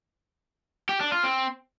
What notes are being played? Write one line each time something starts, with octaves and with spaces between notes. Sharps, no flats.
G4
D4
F4
C4